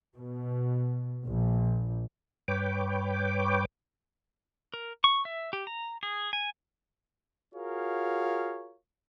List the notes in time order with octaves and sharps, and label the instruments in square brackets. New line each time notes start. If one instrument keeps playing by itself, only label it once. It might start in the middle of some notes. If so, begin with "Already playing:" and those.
[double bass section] B2
A#1
[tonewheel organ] G2 B4 C#5 G5 D6
[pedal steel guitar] A#4
C#6
E5
G4
A#5
G#4
G#5
[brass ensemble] F4 F#4 G#4 A#4 C#5 F5